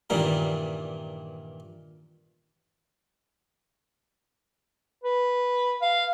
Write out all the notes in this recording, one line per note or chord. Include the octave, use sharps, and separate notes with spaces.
G2 A#2 D#3 E3 G3 A#3
B4
F5